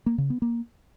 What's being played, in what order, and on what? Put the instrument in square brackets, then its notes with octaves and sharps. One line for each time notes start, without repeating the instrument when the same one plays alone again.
[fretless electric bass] A#3
C#3
B3
A#3